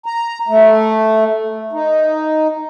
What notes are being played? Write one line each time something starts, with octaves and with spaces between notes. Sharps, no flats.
A#5
A3
D#4